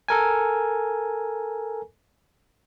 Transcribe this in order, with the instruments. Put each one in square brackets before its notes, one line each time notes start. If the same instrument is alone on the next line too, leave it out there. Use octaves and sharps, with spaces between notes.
[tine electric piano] A4 A#4 G#5